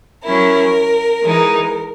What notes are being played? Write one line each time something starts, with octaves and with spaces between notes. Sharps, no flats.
F#3 C#4 E4 A#4
E3 G#3 D#4